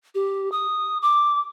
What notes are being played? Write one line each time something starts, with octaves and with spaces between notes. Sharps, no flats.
G4
D#6
D6